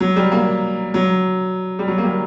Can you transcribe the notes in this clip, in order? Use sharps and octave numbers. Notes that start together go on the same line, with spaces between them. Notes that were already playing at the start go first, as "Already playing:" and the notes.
F#3
G3
A#3
F#3
G3
F#3
A#3
G3